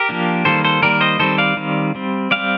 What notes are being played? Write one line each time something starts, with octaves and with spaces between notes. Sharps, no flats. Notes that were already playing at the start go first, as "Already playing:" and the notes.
Already playing: G4 A#4
F3 A#3 D4
D#3 G3 A#3 A4 C5
A4 C5
D#3 G3 A#3 A#4 D5
C5 D#5
D#3 G3 C4 A4 C5
D5 F5
D#3 G3 C4
G3 C4
G3 C4 D5 F5